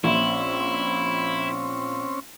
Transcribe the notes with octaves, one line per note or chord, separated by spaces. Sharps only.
A#1 C4 C#4 E4 E5 C6